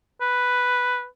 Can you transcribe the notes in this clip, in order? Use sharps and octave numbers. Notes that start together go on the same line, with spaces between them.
B4